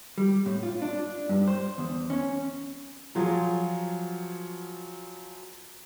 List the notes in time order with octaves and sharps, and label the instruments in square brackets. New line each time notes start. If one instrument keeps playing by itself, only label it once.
[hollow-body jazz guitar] G3
A2
F4
D4
G2
C5
E2
C#4
[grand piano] F3 F#3 F4 G#4